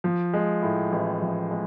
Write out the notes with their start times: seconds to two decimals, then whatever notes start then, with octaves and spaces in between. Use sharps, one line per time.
0.04 F3
0.33 G#3
0.62 A2
0.92 A1
1.22 F3
1.51 G#3